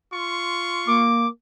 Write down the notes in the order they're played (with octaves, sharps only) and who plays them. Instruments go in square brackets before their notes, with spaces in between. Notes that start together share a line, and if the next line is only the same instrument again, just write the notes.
[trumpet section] F4 C6 C#6
[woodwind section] A#3 [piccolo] D6